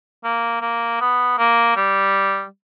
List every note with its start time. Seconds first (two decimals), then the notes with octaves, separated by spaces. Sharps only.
0.24 A#3
0.61 A#3
1.01 B3
1.38 A#3
1.76 G3